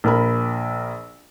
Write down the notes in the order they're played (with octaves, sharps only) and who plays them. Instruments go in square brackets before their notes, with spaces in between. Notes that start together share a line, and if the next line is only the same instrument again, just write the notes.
[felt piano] A#1 A#4 B5